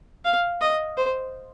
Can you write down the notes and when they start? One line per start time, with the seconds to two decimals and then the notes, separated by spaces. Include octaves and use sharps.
0.25 F5
0.61 D#5
0.97 C5